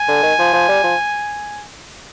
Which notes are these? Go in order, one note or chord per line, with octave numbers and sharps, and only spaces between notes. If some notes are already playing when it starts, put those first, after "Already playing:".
Already playing: G#5
D3
D#3
F3
F3
G3
F3